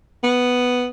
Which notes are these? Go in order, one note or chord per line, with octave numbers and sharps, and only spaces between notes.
B3